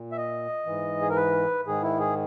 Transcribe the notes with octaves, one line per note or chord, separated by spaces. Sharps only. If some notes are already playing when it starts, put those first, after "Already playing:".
Already playing: A#2
E5
D#5
G#2 E3
G#4
A#4
B4
G#2 D#3 G#4
E4
G#4